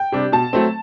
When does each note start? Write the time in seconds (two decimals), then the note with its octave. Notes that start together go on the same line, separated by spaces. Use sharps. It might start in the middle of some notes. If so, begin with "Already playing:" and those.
Already playing: G5
0.12 C3 G3 D4
0.32 B2 A5
0.53 F#3 A3 C4